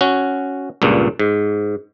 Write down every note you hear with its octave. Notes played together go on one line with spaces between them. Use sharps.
C#4 F#4
C#2 G2 A#2
G#2